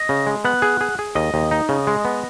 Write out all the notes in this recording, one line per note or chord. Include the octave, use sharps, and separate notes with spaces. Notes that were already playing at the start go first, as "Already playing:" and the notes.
Already playing: D#5
C#3
G#3
B3 F#5
G#4
G#4
G#4
D#2 D#5
D#2
D#4
C#3
G#3
B3